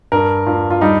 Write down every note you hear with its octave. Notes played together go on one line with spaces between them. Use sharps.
G2 A#4
G2 F4
F4
G3 D#4